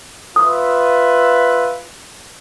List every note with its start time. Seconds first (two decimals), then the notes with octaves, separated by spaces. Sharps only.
0.36 F4 B4 E5 D#6